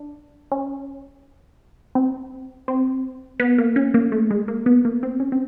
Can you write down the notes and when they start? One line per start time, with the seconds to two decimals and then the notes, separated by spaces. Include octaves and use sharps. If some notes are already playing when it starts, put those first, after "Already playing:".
Already playing: D4
0.52 C#4
1.95 C4
2.68 C4
3.40 B3
3.58 A#3
3.76 C#4
3.94 A#3
4.12 A3
4.31 G#3
4.48 A#3
4.66 B3
4.85 A#3
5.03 C4
5.20 C#4
5.32 C4